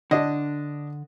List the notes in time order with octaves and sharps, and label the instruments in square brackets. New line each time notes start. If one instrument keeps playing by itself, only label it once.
[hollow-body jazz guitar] D3 [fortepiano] D4 D#5